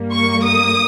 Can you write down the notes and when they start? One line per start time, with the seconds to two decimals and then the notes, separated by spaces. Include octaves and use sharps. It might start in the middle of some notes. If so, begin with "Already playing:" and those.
Already playing: G2 G3 A#3
0.12 C#6
0.44 D#6